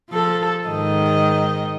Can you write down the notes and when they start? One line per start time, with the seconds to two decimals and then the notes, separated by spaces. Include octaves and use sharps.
0.10 F3 A4
0.68 G#2 D#3 D#5